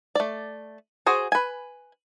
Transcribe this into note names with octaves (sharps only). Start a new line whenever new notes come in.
A3 D5
F#4 G#4 C5
B4 G#5